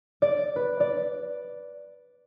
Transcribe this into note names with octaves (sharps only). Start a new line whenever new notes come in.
D5
B4
D5